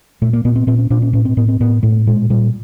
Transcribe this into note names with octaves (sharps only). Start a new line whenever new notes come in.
A#2 A3
A#3
A#2 B3
C4
A#2 C4
C#4
A#2 D4
C#4
A2 C#4
C4
A2 B3
C4
A2 B3
A2 A3
A#2 G#3
A#2 G3